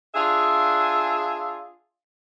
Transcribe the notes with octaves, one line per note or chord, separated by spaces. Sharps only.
D4 F4 G#4 E5